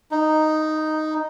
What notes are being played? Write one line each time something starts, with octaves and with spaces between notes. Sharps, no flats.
D#4